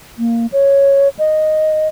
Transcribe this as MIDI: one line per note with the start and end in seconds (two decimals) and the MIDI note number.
0.19 0.46 58
0.52 1.09 73
1.19 1.88 75